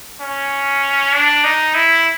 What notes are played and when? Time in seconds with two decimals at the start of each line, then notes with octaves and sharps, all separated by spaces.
0.21 C#4
1.13 D4
1.44 D#4
1.75 E4